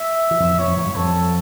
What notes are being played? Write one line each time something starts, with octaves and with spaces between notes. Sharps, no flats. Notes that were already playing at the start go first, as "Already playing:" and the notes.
Already playing: E5
E3
F2 F3
E2 E3 C#5
F2 F3
E2 E3
G2 G3
F2 F3 A4